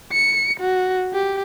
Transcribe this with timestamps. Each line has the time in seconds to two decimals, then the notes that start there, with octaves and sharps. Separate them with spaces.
0.13 C#7
0.60 F#4
1.13 G4